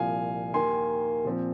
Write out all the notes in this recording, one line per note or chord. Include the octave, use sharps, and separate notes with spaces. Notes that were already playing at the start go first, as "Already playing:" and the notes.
Already playing: C2 A#2 F3 F5 G#5
D#2 D#3 A#3 G#5 C6
A#2 F3 C4